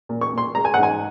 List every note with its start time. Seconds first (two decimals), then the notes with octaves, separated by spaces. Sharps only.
0.09 A#2
0.21 C#6
0.33 A#2 C6
0.55 G#3 A#5
0.65 G#5
0.74 G#2 F#5
0.83 G#5